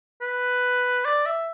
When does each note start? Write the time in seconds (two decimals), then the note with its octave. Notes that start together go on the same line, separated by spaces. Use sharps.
0.22 B4
1.05 D5
1.26 E5